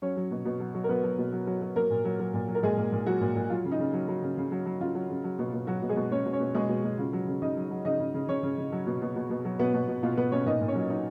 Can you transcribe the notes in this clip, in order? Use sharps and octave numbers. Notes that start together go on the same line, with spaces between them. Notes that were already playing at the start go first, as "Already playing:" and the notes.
F#3 C#4 C#5
F#3
B2
B2
F#3
F#3
A#4
F#3 B3 B4
F#3
B2
F#3
F#3
F#3
F#3 A#3 A#4
A#2
F#3
F#3
A#2
F#3
A#4
A#2 G#3 G#4
A#2
A#2
F#3 F#4
A#2
A#2
F#3 F4
C#3
D#4
C#3
F#3
F#3
C#3
C#3
F#3
F#3
C#3 F4
F#3
C#3
F#3
B2
B2
F#3 F#4
B2
G#3 G#4
B2
B2 C#4 C#5
B2
C#4 C#5
B2
B2 G#3 G#4
B2
B2
C#3 F4
F#3
C#3
C#3 D#4 D#5
F#3
F#3
C#3 D#4 D#5
C#3
C#3
C#3 C#4 C#5
C#3
C#3
F#3
B2
B2
B2
B2
F#3
B2 B3 B4
B2
B2
B2 F4
B2 B3 B4
B2 C#4 C#5
A#2 D#4 D#5
A#2
C#4 C#5
F#3
F#3 D#4